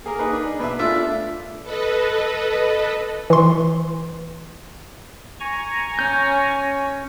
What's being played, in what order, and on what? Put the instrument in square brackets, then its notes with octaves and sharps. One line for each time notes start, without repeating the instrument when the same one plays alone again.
[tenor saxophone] A#3 [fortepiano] G#4 A#4
[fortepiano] D#4 G#4 B4
[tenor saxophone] D4
[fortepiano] B2 E5 [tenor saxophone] B4
[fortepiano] A3 D4 F4 [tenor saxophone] E5
[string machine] A4 B4 D#5
[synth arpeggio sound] E3 C6
[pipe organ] G#5 A#5 C#6
[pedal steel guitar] C#4 G6